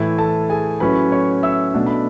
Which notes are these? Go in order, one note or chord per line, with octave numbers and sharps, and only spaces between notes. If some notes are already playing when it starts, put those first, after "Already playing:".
Already playing: A2 E3 A3 E4
A4 A5
G#4 G#5
A2 F#3 C#4 E4 B4 B5
C#5 C#6
E5 E6
B2 A3 D4
B5